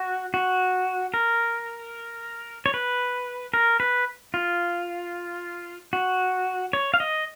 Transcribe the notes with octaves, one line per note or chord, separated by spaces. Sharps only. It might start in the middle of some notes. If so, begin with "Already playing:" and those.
Already playing: F#4
F#4
A#4
C#5
B4
A#4
B4
F4
F#4
C#5
F5
D#5